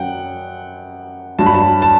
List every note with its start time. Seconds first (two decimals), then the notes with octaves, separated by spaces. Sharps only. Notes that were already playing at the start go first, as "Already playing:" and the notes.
Already playing: F#2 F#3 F#5 G5
1.39 G2 F#3 A5
1.46 B5
1.54 A5
1.82 A5